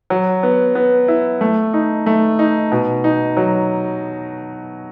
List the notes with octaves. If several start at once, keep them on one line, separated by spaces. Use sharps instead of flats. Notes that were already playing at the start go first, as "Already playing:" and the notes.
F#3
B3
B3
E4
A3
D#4
A3
D#4
B2
D#4
F#3